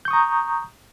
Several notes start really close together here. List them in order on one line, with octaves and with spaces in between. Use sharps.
G6 C#6 D#6 A#5